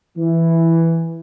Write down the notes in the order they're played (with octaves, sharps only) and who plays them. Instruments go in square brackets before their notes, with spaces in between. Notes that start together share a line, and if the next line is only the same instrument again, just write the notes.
[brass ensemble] E3